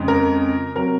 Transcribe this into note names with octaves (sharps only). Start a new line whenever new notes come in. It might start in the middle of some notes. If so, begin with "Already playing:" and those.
Already playing: F2 C#3 G#3
A#4
C3 F#3 A#4